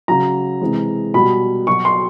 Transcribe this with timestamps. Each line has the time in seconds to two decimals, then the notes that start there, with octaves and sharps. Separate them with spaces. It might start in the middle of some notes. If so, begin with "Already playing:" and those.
0.08 C#3 F#3 A#5
0.61 C3 E3 G#3
1.14 B2 G3 B5
1.67 B2 F#3 C#6
1.85 C6